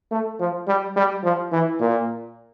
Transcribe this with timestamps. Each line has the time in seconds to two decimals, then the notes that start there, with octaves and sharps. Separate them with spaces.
0.12 A3
0.40 F3
0.68 G3
0.96 G3
1.24 F3
1.52 E3
1.80 A#2